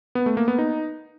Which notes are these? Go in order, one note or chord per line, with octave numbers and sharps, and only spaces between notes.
B3
A3
A#3
B3
D#4